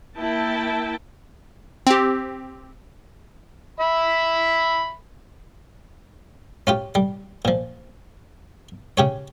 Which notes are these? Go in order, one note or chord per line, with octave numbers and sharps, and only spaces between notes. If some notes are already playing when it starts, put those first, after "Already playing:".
A#3 E4 E5 G5 A5
C4 G4
E5 B5
C#4 F4 G4
G3
A#2 F3
C#3 G4 C#5